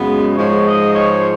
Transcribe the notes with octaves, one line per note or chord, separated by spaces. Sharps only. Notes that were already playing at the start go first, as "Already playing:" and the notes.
Already playing: F#2 C#3 G#3 B3
G#2 F3 G#3 C#5
D#5
C#5